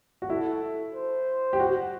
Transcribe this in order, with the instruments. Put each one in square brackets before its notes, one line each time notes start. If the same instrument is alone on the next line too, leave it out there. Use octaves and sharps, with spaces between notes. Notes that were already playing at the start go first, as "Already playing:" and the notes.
[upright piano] F#4
[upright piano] E4 [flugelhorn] A4
[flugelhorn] C5
[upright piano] G4
F#4